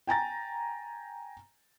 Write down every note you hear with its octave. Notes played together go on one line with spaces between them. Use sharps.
G5 G#5 A#5 A6